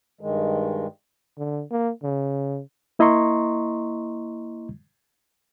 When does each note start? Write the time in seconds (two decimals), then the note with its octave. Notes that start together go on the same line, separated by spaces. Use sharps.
0.21 G2 D#3 G#3
1.38 D3
1.71 A#3
2.03 C#3
2.99 A#3 E4 D#5 A#5 C6 C#6